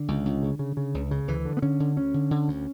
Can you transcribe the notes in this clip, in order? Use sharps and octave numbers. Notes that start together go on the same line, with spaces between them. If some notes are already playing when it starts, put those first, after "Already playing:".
Already playing: D3
C#2
C#2
C#3
C#3
C#3
C#2
C#3
D2 E3
D3
B3
D3 C#4
D3
D2 C#4
D3
D3
D2